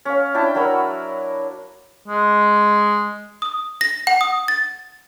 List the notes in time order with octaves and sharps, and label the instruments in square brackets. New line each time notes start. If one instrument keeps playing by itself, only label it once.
[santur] C#4 F5
D4 E4 G5 A5
F#3 F#4 A#4 B5
[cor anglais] G#3
[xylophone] D#6
A#6
F#5
D#6
A6